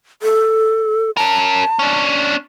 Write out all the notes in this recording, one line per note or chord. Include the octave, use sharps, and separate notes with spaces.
A4
C#4 A#4 A5
C#4 D4